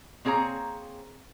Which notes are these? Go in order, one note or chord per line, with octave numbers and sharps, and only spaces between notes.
A#3 C4 G#4 C#5 A#5